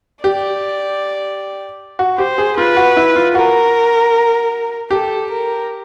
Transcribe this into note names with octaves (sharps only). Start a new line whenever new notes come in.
G4 D5
F#4
G4 C5
G#4
F4 B4
F#4
E4
F4
F#4 A#4
G4 A4
A#4